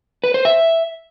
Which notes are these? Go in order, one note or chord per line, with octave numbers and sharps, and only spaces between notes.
B4
C5
E5